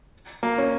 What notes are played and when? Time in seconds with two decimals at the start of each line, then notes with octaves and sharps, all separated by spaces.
0.43 A#3
0.58 C#4